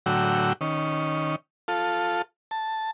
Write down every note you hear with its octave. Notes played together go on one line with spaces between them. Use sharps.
A2 D3 F#3 F#4 G5 E6
D#3 C#4
F4 A4
A5